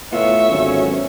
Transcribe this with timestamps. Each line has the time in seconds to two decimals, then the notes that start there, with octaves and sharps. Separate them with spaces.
0.12 A2 B3 F4 E5 C#6
0.50 G#1 D3 F#3 C#4